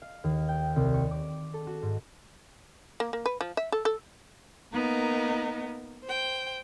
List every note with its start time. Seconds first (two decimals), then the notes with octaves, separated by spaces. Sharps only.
0.02 F5
0.24 D#2
0.48 G5
0.76 C2
0.94 C#6
1.11 D6
1.54 A4
1.67 F#4
1.82 G#2
3.00 A#3
3.13 A#3
3.26 B4
3.41 F3
3.57 E5
3.72 A4
3.85 A4
4.73 A#3 B3 D#4 A#4 D#5
6.03 C5 G5